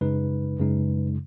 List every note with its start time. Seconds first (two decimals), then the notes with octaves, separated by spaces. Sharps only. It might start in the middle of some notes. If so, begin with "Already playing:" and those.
0.01 F#2 C#3 G#3 D#4 B4
0.59 F#2 C#3 G#3 D#4